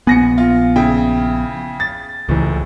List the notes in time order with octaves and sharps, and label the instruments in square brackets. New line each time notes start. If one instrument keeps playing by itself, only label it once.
[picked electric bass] A#1 B3 [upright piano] G#5 A#6 C#7
[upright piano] F4
C#3 E4 G5
A6
[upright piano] D#1 A2 [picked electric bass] C#2 E3